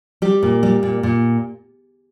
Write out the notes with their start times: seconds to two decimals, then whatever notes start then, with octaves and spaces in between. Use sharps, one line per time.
0.22 G3 G4
0.43 A#2
0.63 G3
0.83 A#2
1.03 A#2